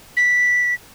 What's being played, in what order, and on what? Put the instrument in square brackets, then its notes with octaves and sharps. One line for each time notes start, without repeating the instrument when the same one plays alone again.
[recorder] B6